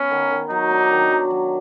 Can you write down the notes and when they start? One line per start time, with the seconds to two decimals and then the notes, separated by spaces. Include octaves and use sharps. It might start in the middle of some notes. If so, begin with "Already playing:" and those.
Already playing: B3 C#4
0.11 D#3
0.31 D#3
0.50 F#3 D#4
0.71 D4
0.91 D#3
1.11 F#3
1.31 F#3